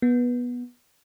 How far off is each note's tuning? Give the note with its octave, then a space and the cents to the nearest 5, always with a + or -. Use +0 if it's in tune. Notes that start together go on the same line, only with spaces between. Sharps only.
B3 -15